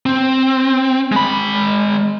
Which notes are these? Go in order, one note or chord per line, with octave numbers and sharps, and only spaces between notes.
C4
G#3 B5